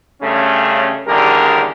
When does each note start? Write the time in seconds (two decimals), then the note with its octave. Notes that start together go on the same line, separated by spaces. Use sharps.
0.22 G2 C#3 A3 C#4
1.07 A1 D#2 D3 G3 G#4 A#4